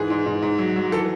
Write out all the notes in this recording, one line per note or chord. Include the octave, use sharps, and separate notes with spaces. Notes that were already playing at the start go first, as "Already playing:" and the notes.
Already playing: G#2 E3 G#4
G#2
G#2
G#2
F#3
F#3
E3 A4